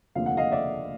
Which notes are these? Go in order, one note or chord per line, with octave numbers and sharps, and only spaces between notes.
F1 D#2 D3 F3 F5
F#5
D#5 F5
D5 E5